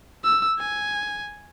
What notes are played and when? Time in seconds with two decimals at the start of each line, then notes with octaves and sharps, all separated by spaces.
0.23 E6
0.59 G#5